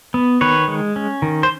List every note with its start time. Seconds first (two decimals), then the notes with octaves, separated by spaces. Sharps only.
0.14 B3
0.41 D#3 B4 C#5
0.68 G#3
0.96 C#4
1.22 D#3
1.43 C5